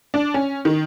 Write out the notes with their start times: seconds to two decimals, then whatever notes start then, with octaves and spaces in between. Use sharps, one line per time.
0.14 D4
0.34 C#4
0.65 D#3